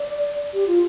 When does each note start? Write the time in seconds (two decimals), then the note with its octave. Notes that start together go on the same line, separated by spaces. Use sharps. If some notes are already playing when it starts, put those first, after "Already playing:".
Already playing: D5
0.54 G4
0.67 F4